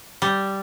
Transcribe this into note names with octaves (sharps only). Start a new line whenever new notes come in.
G3